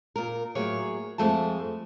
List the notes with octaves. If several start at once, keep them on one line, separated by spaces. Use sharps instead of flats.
A#2 A#4
A2 F#3 A#3 G#4 C#5
F2 G#3 A3 G#4 A5